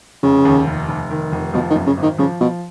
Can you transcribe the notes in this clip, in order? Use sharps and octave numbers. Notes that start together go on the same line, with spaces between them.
F1 C#3
D#2
F1
F1
D#3
F1
B2 F3
D#3
F#2
C#3
G#1
D#3
C#3 F3
B2 F3